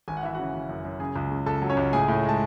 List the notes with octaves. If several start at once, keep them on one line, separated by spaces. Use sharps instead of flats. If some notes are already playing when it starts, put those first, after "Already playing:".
G#1 G#5
F#5
E3 E5
C#3 F#4 F#5
C#3
F#2
F#2
C#3 G#4 G#5
C#2
C#3
C#2 A4 A5
F#3
C#4 C#5
C#2
A2 G#4 G#5
A2
G#3
A5